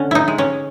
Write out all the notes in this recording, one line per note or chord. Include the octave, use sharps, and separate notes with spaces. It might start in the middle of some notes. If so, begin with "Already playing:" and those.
Already playing: D3 C#4
D#4 E4
G#3
C#4